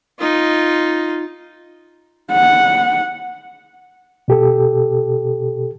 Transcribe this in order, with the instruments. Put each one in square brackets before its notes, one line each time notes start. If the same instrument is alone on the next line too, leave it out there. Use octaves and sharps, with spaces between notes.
[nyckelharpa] D#4 F4
[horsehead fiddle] F#5
[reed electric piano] B2 G4 A4